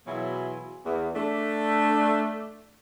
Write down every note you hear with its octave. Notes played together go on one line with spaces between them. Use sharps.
B2 E3 F#3 E4 F4 G#4
E2
A3 D4